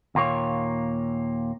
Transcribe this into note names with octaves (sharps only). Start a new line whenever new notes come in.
D#2 A#2 A#3 C#5